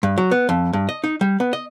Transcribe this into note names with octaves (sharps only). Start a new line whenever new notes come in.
G2
F#3
B3
F2
G2
D#5
D#4
G3
B3
D#5